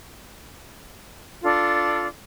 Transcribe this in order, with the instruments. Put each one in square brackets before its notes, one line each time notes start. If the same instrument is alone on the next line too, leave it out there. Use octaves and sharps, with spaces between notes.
[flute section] D4 F4 A4